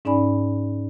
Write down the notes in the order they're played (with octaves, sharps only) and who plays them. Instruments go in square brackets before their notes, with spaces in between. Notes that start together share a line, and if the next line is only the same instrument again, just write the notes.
[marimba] G#2 C#4 D#4 D5 G#5 B5